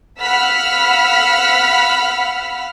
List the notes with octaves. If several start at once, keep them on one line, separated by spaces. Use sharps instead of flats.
F5 F#5 B5 E6 F6 B6